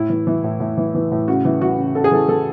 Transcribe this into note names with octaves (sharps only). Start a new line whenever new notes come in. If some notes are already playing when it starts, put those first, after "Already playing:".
Already playing: A2 E4
E3
E3
A2
A2
E3
E3
A2
C#3 F#4
E3
E3 F#4
C#3
C#3 A4
G#4
E3 A4
E3 A4